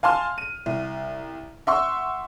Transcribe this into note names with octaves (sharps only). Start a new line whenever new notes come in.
F5 G#5 A5 C6 F6
D#7
C2
E5 F#5 C6 C#6 E6